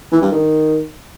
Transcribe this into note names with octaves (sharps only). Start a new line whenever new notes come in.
E3
G2
D#3